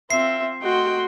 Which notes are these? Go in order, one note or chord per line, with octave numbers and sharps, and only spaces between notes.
C4 F4 E5 C7
A3 F#4 D#5 G5 C6